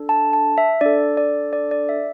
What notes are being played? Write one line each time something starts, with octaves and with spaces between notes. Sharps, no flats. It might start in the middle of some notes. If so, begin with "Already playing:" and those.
Already playing: D4 A4
A5
A5
E5
D4 A4 D5
D5
D5
D5
E5